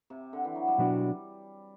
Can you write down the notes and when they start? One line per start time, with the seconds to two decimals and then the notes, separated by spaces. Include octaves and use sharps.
0.10 C3
0.33 D3
0.44 E3
0.55 F#3
0.68 G3
0.78 B2 F#3 B3 D4 F#4